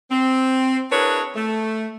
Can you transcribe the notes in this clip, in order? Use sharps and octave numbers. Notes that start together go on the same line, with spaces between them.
C4
D4 E4 G#4 A#4 B4 C#5
A3